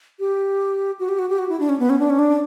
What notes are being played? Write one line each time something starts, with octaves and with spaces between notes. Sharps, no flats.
G4
F#4
G4
F#4
G4
F#4
E4
D4
C#4
B3
C#4
D4
C#4
D4